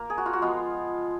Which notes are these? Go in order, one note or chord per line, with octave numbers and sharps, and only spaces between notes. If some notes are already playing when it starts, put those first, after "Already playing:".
Already playing: A#3 A#4
G#4
F#4
F4
F#4
F3 G#3 B3 F4